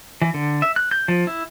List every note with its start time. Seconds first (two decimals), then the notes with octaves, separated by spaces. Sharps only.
0.22 E3
0.34 D3
0.62 E5
0.76 F#6
0.91 G6
1.08 F3
1.27 E4